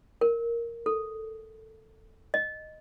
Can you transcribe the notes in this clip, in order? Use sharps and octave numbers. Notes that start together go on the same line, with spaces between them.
A#4
A4
D#5